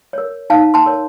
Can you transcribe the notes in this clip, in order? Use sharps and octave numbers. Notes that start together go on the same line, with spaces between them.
A#4 C#5
D#4 F5 A5
A5 C6
A#4 C#5